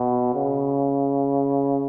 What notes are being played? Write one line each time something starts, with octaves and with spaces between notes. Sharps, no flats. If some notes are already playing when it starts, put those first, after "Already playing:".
Already playing: B2
C#3